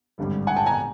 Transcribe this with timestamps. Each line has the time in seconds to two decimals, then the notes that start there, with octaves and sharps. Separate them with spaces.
0.18 G#1 G2 D3 G3
0.47 F#5 G#5
0.56 G5 A5
0.66 G#5 A#5